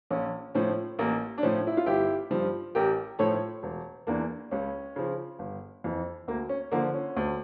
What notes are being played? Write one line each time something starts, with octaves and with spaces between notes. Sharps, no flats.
A#1 C#4
A2 F3 C#4
A1 A#3
D4
A2 F3 C#4
E4
F4
G1 E4 G4
G2 F3
A1 G4 A#4
A2 F3 A4 C#5
E1
E2 E3 A#3 D4
C#2 C#4
C#3 F3
G1
F2 E3
D2 A#3
C#4
D3 F3 A#3
C#4
D2